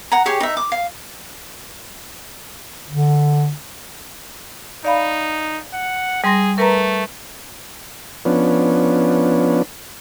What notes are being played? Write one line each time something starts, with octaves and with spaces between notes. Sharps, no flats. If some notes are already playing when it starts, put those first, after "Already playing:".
F#5 A#5
G4 G#4 C#5 G5
D#4 E5
D6
F5
D3
D#4 D5 F5 B5
F#5
G3 G#4 C6 A#6
A3 A#4 B4 A#5
F3 B3 C#4 D4